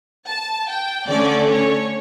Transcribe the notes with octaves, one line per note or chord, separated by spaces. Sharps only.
A5
G5
D3 A3 C#4 D5
C#5